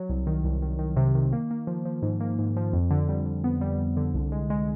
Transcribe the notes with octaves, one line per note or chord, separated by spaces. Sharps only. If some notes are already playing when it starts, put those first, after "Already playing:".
Already playing: F#3
C2
D#3
C2
D#3
D#3
C3
D#3
A#3
A#3
F3
F3
G#2
A#3
G#2
F3
F2
D3
G3
D3
B3
G3
G3
D3
C2
G#3
G#3